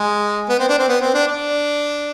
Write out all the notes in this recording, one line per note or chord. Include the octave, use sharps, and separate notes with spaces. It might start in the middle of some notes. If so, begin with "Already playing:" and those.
Already playing: G#3
B3
C4
D4
C4
B3
C4
D4
D4